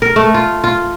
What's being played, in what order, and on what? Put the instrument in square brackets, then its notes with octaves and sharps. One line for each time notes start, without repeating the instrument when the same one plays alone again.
[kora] A#4
A3
F4
F4